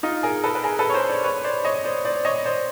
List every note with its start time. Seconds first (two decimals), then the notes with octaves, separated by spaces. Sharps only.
0.03 D#4 F4
0.23 G#4 A#4
0.44 A4 B4
0.55 B4
0.63 G#4 A#4
0.79 A4 B4
0.89 C#5
0.94 A#4 C5
1.09 C5 D5
1.24 B4 C#5
1.44 C5 D5
1.65 C#5 D#5
1.84 C5 D5
2.05 C5 D5
2.25 C#5 D#5
2.45 C5 D5